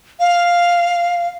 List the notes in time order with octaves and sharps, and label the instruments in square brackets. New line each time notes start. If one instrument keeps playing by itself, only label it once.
[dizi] F5